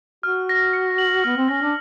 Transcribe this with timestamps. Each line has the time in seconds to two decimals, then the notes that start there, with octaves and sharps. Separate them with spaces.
0.23 F#4 F6
0.49 A#6
0.73 C#7
0.98 F#7
1.24 B3 F6
1.37 C4
1.48 C#4 A#6
1.62 D4